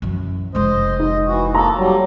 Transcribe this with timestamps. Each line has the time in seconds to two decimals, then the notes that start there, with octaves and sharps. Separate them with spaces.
0.02 F#2 E3
0.55 F1 G#3 C5 D#5
0.99 D#4 D#5
1.26 E3 F#4
1.55 A#3 A4 A#5
1.76 F#3 G3